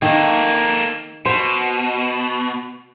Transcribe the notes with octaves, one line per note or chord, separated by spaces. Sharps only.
D#3 A#3 A4
B2 C5